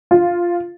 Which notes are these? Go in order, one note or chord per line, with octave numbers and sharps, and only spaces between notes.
F4